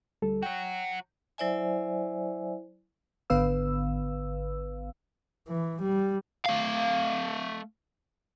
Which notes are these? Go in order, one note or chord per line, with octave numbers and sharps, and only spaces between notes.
D2 G3 A4
F#3 F#4 G5
F#3 E4 C5 D5 E5 G#5
G#1 D3 B3 B4 F5 E6
E3
G3
A3 F5